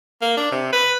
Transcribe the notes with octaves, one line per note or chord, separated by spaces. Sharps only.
A#3
D4
C3
B4